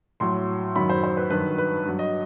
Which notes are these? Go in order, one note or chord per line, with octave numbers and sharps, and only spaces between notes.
A2 F#3 C6
F#2 D#3 F#3 B5
C5
C5
B4
G2 D#3 F#3 B4
B4
G2 F#3
D#5